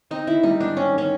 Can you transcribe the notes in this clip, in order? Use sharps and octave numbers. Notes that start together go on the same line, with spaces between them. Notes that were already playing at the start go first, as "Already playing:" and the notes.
C4 D#4
D#3 E4
G3 D#4
G#2 D4
C4 C#4
D#3
C#4